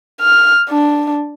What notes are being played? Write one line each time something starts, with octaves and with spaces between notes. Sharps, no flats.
F6
D4